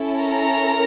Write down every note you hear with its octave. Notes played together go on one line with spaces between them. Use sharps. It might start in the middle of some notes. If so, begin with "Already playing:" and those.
Already playing: C#4 E4 A4
A#4 A#5